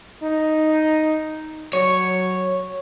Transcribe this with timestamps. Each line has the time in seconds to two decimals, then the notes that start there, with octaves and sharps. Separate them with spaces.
0.23 D#4
1.73 F#3 C#5